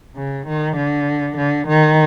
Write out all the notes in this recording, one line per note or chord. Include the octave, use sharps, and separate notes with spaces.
C#3
D#3
D3
D3
D#3